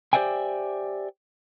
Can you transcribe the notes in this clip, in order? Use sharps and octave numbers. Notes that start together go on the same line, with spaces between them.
G4 C5 D5 E5 G5 G#5